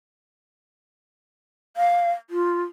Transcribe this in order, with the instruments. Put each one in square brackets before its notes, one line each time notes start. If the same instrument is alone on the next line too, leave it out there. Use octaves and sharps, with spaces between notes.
[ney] F5
F4